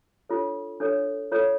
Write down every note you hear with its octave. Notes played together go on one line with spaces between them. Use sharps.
D4 F4 A4 C#5
D4 A4 C#5
F4 A4 C#5